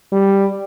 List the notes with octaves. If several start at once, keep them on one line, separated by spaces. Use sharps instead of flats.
G3